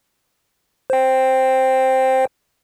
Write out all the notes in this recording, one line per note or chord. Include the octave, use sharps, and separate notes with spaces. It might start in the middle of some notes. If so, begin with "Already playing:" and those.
C5 G5